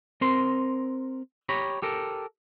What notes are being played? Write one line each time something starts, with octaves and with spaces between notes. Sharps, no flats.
C4 A#4 C6
G4 C#5 A#5 B5
G4 A4 A#4